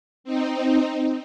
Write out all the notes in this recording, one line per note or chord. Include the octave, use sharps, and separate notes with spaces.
C4 D#4